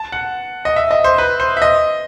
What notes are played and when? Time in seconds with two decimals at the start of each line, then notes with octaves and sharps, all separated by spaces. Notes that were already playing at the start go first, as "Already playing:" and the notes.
Already playing: A5
0.12 F#5
0.65 D#5
0.76 E5
0.91 D#5
1.04 C5
1.18 B4
1.40 C5
1.57 E5
1.62 D#5